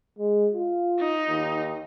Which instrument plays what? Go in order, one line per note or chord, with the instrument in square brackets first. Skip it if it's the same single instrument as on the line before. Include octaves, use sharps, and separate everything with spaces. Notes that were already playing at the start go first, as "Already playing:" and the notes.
[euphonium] G#3
F4
[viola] D#4
[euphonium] D#2